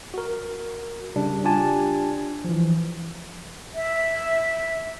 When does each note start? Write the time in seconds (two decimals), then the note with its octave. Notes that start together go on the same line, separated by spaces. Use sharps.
0.14 F#4 A#4
1.16 C#3 G3 D4
1.44 D4 F4 G4 G#5 A5
2.44 E3 F3
3.75 E5